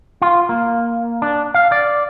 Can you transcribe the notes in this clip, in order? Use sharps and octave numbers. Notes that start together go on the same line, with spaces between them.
F4
A#3
D4
F5
D5